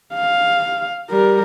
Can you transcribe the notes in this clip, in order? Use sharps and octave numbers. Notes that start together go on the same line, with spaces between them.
F5
G3 A#4